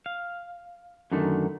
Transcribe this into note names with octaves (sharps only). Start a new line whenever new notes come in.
F5
F#2 D3 D#3 A3